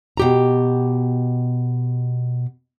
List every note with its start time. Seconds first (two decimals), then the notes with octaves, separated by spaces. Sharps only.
0.17 B2 G4 A#5